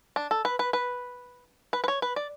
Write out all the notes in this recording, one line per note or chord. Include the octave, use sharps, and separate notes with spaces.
D4
A4
B4
B4
B4
B4
B4
C#5
B4
D5